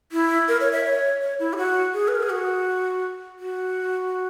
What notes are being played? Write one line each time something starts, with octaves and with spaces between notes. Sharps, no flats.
E4
A#4
C#5
E5
C#5
C#5
E4
G#4
F#4
G#4
B4
A#4
G#4
F#4
F#4